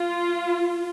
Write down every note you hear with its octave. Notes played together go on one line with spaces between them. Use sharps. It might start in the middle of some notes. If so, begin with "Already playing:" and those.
Already playing: F4